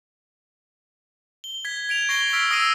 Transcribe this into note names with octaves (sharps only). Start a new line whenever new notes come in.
G7
G#6 B6
G#6 D7 F7
C#6 A#6 C7 D7 G7
E6 F6 A#6 B6 D7
D#6 E6 A#6 C7 D#7